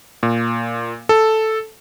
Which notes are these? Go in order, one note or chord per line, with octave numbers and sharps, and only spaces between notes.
A#2
A4